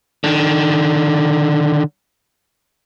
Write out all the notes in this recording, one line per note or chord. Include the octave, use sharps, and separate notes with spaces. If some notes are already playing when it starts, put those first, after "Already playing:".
D3 D#3